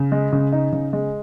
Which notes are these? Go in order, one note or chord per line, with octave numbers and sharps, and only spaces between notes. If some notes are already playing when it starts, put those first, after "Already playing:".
Already playing: C#3
G#3
C#3
D#4
C#3
G#3